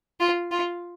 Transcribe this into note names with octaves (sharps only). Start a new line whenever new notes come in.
F4
F4